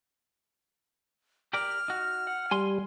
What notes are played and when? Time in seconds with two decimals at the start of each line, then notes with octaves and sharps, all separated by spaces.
1.53 G4 A#4 D5 F6
1.88 D#4 F#4
2.27 F#5
2.51 G3 G#5 C6